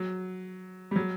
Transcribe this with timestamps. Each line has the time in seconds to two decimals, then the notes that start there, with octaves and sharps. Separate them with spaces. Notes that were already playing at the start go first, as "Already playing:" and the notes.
Already playing: F#3
0.91 G3
0.96 F#3